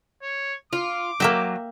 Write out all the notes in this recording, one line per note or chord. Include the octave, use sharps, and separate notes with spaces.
C#5
F4 D6
F#3 A#3 E5 G5